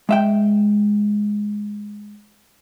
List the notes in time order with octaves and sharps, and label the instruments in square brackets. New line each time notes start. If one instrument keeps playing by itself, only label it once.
[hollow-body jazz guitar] G#3 E5 G5